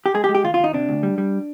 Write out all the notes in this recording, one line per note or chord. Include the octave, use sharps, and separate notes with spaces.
G4
G#3 G#4
G4
G#3
G4
D#2 F4
F4
D#2 D#4
C3 D4
D2
G3
G3